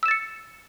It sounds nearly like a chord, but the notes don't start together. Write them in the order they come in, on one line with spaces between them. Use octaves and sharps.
E6 E7 A6 C#7